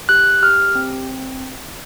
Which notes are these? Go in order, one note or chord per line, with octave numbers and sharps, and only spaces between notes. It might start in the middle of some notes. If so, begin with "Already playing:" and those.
G4 F#6
G4 F6
C4